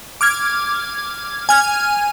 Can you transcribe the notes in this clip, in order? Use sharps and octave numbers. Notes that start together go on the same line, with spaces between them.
D6 F6 G#6
G#5 F6 G#6